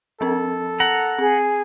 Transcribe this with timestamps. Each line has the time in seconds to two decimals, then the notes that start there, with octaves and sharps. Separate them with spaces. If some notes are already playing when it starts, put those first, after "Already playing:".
0.21 F3 C4 A4 A#4
0.80 F#5 A#5
1.18 C4 G#4